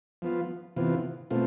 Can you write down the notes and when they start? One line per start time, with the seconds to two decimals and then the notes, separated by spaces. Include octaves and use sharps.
0.22 F3 B3 F4
0.76 C3 E3 B3 F4
1.30 B2 A3 C4 F4